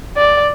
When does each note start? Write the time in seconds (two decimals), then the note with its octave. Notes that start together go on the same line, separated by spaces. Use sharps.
0.17 D5